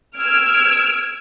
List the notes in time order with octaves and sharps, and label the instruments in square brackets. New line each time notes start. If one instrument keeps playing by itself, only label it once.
[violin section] E6 F6 G#6 D7